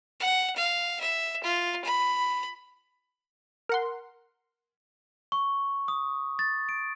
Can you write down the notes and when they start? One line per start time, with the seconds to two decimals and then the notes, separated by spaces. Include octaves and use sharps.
0.20 F#5
0.56 F5
1.00 E5
1.44 F4
1.85 B5
3.69 A#4 F#5 C6
5.32 C#6
5.88 D#6
6.39 A6
6.69 D7